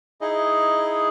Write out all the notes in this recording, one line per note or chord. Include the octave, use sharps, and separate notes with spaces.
D#4 E4 G#4 D#5